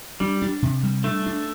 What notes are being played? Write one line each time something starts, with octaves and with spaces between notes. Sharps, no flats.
G3 D4
D4
C3
G3
A3 D4
D4